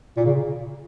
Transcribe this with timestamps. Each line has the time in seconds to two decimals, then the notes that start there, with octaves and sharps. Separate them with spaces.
0.17 A#2
0.25 C#3